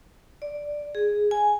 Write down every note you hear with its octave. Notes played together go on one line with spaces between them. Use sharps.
D5
G#4
G#5